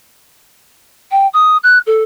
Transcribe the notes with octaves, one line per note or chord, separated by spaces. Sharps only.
G5
D#6
F#6
A4